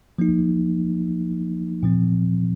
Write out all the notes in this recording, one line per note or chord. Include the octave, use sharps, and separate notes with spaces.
F3 A#3 D#4
A#2 F3 C4